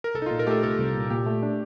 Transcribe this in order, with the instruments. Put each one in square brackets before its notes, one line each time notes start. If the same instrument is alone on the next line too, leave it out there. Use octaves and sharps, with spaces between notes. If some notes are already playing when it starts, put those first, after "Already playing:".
[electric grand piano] A#4
[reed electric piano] C2 [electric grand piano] A4
[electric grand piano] D#4
[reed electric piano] A#2 [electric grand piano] F4
[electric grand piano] A#4
[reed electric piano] A3 [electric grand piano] G4 A4
[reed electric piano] C2 [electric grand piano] A4
[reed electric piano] C2
A#2
[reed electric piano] A#2 [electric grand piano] G4
[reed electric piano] A3
D4